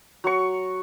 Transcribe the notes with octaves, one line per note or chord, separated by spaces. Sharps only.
F#3 C#6